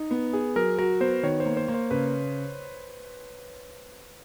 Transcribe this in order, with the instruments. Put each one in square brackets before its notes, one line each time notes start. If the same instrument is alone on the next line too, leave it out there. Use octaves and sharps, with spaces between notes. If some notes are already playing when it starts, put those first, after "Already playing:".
Already playing: [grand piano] D#4
B3
G#4
[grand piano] F#3 [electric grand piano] A#4
[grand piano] F#4 [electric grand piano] A#4
[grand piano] B3 [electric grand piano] C5
[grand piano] D#3 [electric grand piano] C#5
[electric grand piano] C5
[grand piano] A#3
[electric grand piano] C5
[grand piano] A#3
[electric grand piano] C5
[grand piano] C#3 [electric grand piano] B4